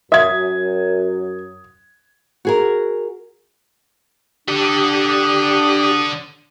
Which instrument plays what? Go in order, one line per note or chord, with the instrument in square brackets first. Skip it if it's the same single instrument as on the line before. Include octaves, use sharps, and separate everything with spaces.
[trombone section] F#2 [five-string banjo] E5 [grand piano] D#6 G#6
[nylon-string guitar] F#4 G#4 A#4
[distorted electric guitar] D3 A4 [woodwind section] D4 [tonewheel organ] G4 [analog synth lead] D#6